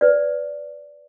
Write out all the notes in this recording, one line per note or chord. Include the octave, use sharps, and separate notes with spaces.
B4 D5